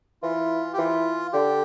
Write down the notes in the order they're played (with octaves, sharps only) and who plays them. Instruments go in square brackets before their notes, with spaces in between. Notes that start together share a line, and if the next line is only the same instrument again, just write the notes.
[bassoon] E3 [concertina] F4
[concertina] G4
[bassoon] E3 [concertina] F4
[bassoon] D3 [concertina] G4